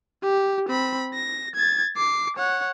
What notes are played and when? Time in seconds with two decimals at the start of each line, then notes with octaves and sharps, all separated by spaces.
0.23 G4
0.69 C4 B5
1.14 A#6
1.55 G#6 A6
1.97 D6 C7
2.36 C#5 F#5